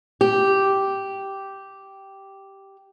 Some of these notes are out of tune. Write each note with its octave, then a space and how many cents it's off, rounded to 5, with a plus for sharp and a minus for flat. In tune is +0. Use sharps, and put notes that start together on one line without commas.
G4 -5